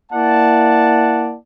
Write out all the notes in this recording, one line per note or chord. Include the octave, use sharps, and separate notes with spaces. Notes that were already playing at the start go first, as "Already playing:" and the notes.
A#3 E4 D5 F#5 A5